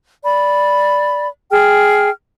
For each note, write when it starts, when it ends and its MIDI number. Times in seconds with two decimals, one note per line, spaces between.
0.23 1.27 74
0.23 1.27 83
1.51 2.09 68
1.51 2.09 79
1.51 2.09 89